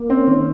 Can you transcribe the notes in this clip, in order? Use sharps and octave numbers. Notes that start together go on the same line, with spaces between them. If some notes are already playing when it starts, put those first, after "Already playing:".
Already playing: A#3
C4 C#4
D#3